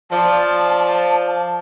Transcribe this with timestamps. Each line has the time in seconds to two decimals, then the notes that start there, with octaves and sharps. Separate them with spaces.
0.11 F3 D5 A5